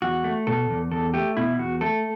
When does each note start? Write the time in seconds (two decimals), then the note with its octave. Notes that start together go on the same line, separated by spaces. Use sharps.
0.02 E2 F#4
0.24 A3
0.47 B2 A4
0.70 E2
0.91 E2 A4
1.14 A3 G4
1.37 B2 E4
1.58 E2 F#4
1.81 A3 A4